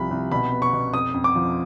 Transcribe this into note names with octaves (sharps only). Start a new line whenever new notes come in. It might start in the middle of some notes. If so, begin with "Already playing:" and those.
Already playing: C2 F3 G3 B5
C2
B2 B5
B3
C#6
B2
F2 D#6
F2
D6
F3